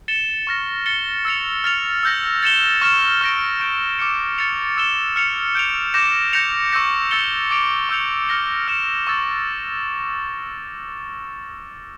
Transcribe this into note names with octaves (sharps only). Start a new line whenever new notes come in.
A6 C#7 E7 G7
C#6 F6 A#6
A6 C#7 G7
E6 A6 C#7 F7
F6 A6 C#7 F7
E6 G6 A#6
A6 C#7 E7 G7
C#6 F6 A6 E7
C#6 F6 A#6 D7
C#6 G6 D7
D6 F6 C#7 E7
F6 A6 C#7 F7
E6 A6 E7 G7
F6 C#7 F7
G6 D7 F7
D6 G6 A#6 E7
G6 A#6 C#7 F7
C#6 E6 G6 A#6
E6 A6 C#7 G7
D6 A6 D7 F7
C#6 E6 G6 C#7 F7
F6 A#6 C#7 G7
F6 C#7 E7
C#6 E6 A6